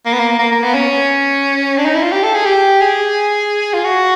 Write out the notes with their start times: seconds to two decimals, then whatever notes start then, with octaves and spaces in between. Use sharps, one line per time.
0.05 A#3
0.13 B3
0.19 A#3
0.39 A#3
0.52 A#3
0.63 B3
0.74 C#4
1.78 D4
1.86 D#4
1.94 E4
2.03 F4
2.12 G4
2.23 A4
2.34 G#4
2.46 G4
2.81 G#4
3.73 F4
3.84 F#4